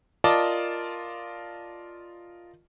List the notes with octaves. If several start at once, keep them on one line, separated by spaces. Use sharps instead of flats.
F4 A#4 D5 D#5 A5 D6